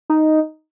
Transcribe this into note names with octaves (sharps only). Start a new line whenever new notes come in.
D#4